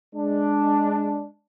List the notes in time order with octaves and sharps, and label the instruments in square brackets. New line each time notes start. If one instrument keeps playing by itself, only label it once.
[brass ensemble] G#3 D4